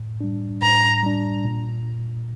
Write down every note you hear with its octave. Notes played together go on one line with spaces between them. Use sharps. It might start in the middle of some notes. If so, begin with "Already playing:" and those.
Already playing: A2
G3 D4
A2 A#5
G3 D4
A#2